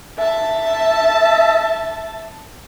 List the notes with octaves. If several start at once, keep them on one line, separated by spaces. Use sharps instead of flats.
E5 A5